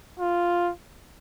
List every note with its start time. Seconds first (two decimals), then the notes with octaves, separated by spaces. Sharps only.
0.19 F4